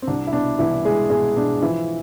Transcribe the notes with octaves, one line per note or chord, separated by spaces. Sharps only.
C4
C2 D4
E4
B2 D4
C2 E3 E4
G#3 G#4
B2 G#3 G#4
B2 D4
E3 F3 E4